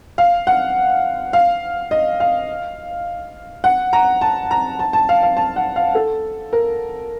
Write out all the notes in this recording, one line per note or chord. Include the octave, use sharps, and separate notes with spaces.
F5
F#5
F5
D#5
F5
F#5
A#5
A5
A#5
A5
A5
F5
F5
A5
F#5
F5
A4
A#4